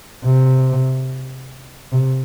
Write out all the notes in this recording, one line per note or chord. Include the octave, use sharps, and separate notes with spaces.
C3
C3